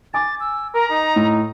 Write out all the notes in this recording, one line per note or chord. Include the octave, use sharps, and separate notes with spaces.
G#5 D6 A6
E6
A#4 A#5
D#4
A2